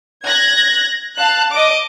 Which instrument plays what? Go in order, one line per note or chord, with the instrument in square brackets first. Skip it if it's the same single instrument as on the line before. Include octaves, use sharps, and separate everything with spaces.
[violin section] F#6 G#6 A#6
F5 A5 F#6
D#5 D6